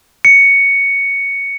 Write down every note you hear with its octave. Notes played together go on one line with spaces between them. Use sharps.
C#7